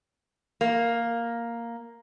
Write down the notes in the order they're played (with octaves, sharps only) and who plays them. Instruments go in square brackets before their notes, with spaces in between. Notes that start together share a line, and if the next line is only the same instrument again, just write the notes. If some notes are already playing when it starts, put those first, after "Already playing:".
[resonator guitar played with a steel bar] A#3